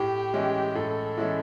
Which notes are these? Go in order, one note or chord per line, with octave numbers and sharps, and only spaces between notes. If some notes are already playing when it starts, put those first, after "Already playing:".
Already playing: A2 G4
E3 G#3 C#4 E4
A2 A4
E3 G#3 C#4 E4